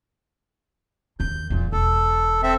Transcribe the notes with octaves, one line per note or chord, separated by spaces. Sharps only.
D#2 G6
D1 E2 A#2
E1 A4
C4 A4 E5